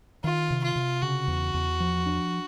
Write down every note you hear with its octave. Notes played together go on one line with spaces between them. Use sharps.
D#3 F4
C3
F4
C3
C#3 F#4
E2
E2
F3
D4